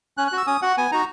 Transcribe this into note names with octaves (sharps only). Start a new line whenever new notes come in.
C#4 F#6
F#6
F#4
E6
C#4 D#6
F#4 F#5
B3 G#5
D#4 F#4 A#5